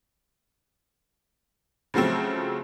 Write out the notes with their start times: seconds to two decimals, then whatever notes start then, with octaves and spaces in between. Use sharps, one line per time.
1.94 C#3 F3 F#3 A3 C4